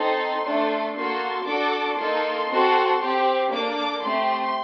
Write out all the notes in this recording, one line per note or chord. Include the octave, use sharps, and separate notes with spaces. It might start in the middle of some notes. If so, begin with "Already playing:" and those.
Already playing: C4 D#4 A4 C6
A3 D4 A4
A#3 F#4 A4 C6
D4 F#4 A4 D6
A#3 D#4 A4 C6
C4 F#4 A4
C4 G4
A#3 D4 A4 D6
A3 C4 G4 C6